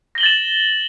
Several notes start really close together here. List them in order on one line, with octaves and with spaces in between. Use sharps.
A#6 G7 F#7 A6 E7